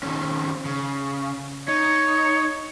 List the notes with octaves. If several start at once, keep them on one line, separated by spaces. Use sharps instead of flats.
D#3 C4 C#4
C#3
D#4 C#5